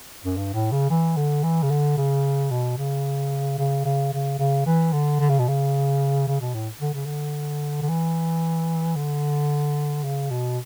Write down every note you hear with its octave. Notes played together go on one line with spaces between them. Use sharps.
F#2
G2
A2
C#3
E3
D3
E3
C#3
D3
C#3
B2
C#3
C#3
C#3
C#3
C#3
E3
D3
D3
C#3
B2
C#3
C#3
B2
A2
D3
C#3
D3
D3
E3
D3
C#3
B2